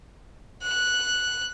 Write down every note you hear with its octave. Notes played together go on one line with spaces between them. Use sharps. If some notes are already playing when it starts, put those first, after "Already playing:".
F#6